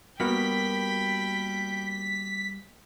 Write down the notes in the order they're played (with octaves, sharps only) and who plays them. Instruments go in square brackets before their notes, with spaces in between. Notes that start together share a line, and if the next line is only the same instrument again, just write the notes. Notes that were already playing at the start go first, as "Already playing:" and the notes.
[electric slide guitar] G3 [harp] A#3 B3 F#4 [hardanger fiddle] G5 B5 [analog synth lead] B6